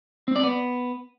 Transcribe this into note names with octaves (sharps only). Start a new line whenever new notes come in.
C4
D5
B3